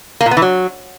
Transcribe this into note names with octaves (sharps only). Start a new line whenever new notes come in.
A#3
A#2
B3
E3
F#3